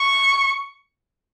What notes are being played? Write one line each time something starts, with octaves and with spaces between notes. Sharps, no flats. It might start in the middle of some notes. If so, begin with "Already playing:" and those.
Already playing: C#6